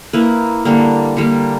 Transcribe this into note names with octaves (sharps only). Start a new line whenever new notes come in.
A#3 E4 B4
D3 G3 A#3
D3 G3 A#3